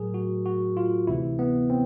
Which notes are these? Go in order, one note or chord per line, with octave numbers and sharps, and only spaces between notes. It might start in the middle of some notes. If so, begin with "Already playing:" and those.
Already playing: A2 F#3 G#4 A#4
F#4
F#4
F4
D2 C3 E3 E4
B3
C4